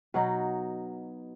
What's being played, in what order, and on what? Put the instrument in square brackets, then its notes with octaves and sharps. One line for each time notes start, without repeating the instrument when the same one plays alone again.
[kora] B2 F#3 D#4